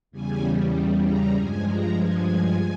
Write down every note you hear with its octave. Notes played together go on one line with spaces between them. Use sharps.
E2 C#3 G3 G#5
A#5
G2 F3 G#3 G#5
A#5
G#5